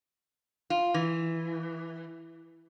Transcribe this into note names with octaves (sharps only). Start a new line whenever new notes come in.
F4
E3